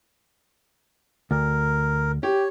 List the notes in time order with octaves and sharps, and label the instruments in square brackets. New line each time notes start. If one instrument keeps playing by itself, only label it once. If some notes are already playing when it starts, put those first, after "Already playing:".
[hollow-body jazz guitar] D2 [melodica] A#4
[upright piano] G4 [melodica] C#5